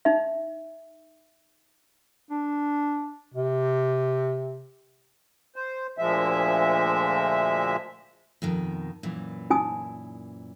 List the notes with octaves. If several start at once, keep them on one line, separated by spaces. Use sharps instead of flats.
D#4 E5
D4
C3
C5
D2 A#2 F3 G#3 E5
F2 B2 D#3
F#2 A#2 E3
D#4 G#5 D#6